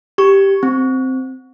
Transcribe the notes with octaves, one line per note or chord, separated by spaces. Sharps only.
G4 C#6
C4